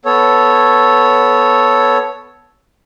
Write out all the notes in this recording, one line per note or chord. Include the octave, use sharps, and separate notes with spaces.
B3 A4 C#5